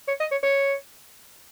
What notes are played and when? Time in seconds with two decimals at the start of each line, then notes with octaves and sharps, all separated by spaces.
0.08 C#5
0.20 D#5
0.31 C#5
0.43 C#5